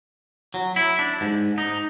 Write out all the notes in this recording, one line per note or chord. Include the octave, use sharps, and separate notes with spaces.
F#3
E4
D4
G#2
D#4